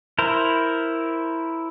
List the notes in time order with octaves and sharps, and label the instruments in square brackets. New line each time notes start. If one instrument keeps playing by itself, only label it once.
[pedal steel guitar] E4 A#4 C5